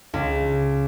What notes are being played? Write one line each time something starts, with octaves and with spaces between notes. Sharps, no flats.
C#2